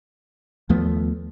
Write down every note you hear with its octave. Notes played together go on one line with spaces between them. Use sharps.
D#2 F3 A3 B3